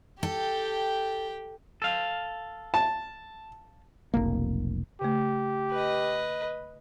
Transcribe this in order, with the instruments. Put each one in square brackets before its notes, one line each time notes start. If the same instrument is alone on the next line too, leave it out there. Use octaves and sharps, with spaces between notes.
[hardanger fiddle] G4 G5 [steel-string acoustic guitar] A4
[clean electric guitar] A4 F5
[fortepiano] A5
[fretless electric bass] F1 B1 A#3
[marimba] C#3 A3 [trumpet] G4
[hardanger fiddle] B4 D#5